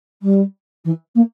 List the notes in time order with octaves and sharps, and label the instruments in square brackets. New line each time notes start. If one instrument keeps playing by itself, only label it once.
[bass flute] G3
E3
A#3